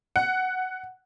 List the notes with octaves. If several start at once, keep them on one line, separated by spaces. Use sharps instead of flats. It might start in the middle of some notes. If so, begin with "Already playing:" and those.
F#5